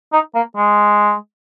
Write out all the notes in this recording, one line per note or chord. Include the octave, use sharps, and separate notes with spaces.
D#4
A#3
G#3